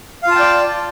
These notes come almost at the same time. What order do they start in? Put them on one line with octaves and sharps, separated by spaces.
F5 F4 A5 G5 D5